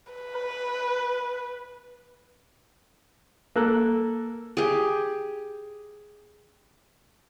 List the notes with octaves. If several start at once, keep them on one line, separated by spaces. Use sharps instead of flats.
B4
A#3 A4 F#6
G4 G#4